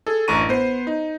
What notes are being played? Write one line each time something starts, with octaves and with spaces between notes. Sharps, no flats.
G#4 A4
A1 F#2 D4 A#5 C#6 D#7
B3 C5
D#4